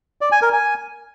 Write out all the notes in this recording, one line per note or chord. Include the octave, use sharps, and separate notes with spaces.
D5
G#5
A#4
G#5